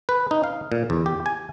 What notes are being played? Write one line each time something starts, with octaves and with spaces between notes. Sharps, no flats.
B4
D#4
F5
A#2
E2
G4
G#5